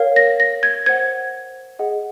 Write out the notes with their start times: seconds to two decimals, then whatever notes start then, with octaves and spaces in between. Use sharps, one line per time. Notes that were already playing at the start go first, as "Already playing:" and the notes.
Already playing: A#4 C#5 F5
0.16 A#6
0.40 A#6
0.63 G#6
0.86 C5 F#5 G#6
1.79 G#4 D#5 F#5